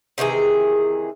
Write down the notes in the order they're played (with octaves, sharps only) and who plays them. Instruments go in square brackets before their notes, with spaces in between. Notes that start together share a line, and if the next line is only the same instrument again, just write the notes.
[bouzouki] C3 D#3 E3 G#4